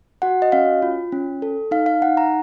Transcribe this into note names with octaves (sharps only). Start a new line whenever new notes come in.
F#4 F#5
D#5
C#4 F5
F4
C#4
A4
D#4 F5
F5
D#4 F#5
A#5